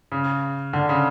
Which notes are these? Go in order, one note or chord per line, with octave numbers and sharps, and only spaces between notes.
C#3
D3
C#3